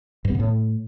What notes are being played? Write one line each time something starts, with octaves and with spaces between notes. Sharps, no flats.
G2
B3
C#3
A2